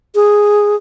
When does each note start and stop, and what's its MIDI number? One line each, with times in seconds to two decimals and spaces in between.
0.15 0.76 68